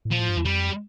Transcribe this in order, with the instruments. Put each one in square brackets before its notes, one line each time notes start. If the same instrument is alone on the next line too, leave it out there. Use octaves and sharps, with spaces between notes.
[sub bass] A2
[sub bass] A#2 [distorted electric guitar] F3
[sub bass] A2
G2
E2
[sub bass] F2 [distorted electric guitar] G3